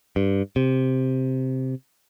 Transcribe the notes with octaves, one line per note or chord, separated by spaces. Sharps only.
G2
C3